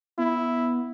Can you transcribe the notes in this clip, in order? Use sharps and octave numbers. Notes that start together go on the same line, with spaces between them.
B3 E4